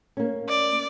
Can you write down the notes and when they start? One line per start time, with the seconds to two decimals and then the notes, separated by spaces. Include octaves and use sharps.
0.17 A#3 C#4
0.49 D5